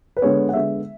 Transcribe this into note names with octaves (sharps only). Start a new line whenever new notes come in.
B4
D3 G#3 B3 C#5
F#5
D3 G#3 B3 E5